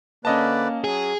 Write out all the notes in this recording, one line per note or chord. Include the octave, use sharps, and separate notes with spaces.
D3 A#3 C#4 B4 D5 D#5 A5
F#3 G#4